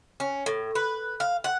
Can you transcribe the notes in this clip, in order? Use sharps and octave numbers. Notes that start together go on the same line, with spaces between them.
C#4
A2
B4
F5
F#5